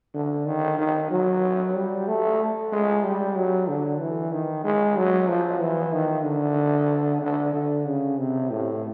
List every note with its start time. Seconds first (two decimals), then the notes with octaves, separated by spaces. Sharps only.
0.15 D3
0.46 D#3
0.78 D#3
1.11 F#3
1.75 G3
2.08 A3
2.72 G#3
3.04 G3
3.36 F#3
3.68 D3
4.00 E3
4.32 D#3
4.64 G#3
4.97 F#3
5.28 F3
5.61 E3
5.94 D#3
6.25 D3
7.22 D3
7.54 D3
7.86 C#3
8.19 C3
8.51 A2